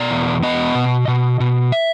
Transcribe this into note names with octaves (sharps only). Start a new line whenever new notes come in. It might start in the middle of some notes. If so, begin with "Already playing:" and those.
Already playing: B2 D5
E2
B3 D#5
B2
B2
B2
E5